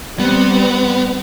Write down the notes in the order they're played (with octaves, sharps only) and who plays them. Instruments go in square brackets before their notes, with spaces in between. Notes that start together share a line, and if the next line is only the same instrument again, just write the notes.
[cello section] G3 C4 [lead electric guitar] B3